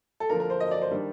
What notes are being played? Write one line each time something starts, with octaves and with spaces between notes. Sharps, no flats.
A4
D3 F3 A#3 D4 A#4
A#4
C5
D#5
D5
C5
D#3 G3 A#3 D4